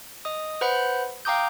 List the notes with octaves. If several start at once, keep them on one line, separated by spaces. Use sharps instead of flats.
D#5 D#6
B4 C5 F#5 B5 F#6 G6
F5 G5 A#5 D6 D#6 G6